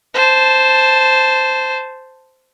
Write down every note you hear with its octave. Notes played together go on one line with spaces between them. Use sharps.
C5 A5